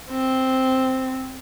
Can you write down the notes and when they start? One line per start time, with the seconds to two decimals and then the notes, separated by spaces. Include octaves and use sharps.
0.11 C4